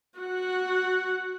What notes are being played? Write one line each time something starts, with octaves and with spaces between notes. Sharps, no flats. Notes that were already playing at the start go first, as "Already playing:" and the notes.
F#4 F#5